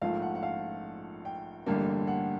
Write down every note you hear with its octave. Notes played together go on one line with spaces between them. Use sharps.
A#1 G#2 F3 A3 F5
F#5
F#5
F5
G5
A1 G2 D3 G3 A#3
F#5